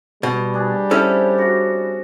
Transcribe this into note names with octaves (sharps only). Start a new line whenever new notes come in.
B2 G3
D4 G#4
C4 C#4 E4 A4
F#4